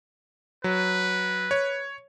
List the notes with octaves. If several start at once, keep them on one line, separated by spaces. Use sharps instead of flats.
F#3 B4
C#5